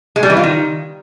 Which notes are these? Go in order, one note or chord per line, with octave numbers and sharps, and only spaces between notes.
G#3
G3
E3
F4
D#3